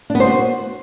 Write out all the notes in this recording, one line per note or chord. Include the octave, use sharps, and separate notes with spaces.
D4
B3
C5
F#4